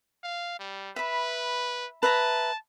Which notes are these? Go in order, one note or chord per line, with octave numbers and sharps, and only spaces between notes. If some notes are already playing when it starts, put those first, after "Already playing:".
F5
G3
B4 E5 B5
B4 E5 A5 A#5